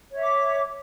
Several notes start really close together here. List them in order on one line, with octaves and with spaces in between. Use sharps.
C#5 E5 D6